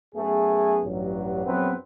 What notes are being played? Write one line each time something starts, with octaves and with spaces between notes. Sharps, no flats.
F#2 A3 B3 G#4
A1 G2 F#3
A#1 F#2 F#3 B3 C4 B4